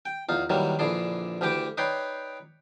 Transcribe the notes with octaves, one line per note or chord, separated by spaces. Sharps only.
G5
E2 D#4 F4
D#3 E3 F#3 G3 A#3
A#1 D3 E3 G#4 D5 C6
D2 D3 E3 G4 G5 D6
D#4 B4 C#5 D5 G5 C6